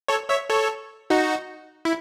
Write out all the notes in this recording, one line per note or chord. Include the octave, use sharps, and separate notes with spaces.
A4 C#5
C#5 E5
A4 C#5
D#4 F#4
E4